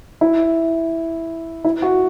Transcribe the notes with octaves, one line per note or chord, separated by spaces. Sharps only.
E4
E4
F#4